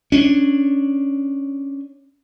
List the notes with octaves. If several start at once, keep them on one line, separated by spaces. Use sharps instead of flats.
C#4 D4